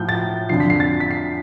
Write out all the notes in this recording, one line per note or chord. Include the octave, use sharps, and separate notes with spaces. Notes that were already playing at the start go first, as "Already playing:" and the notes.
Already playing: A2 F3 G6
A6
F2 D3 F3 C7
B6
C7
A6
B6
C7